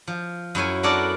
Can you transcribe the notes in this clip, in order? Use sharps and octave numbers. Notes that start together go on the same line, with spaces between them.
F3
F#2 E4 C#5 G#5
B3 D4 F#4 A4 A#4 D5